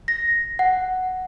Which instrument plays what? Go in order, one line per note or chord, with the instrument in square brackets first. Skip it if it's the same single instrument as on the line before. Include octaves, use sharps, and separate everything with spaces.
[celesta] A#6
F#5